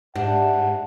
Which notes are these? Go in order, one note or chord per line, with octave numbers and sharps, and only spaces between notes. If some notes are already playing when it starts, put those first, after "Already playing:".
G#2 D4 G4 E5 F#5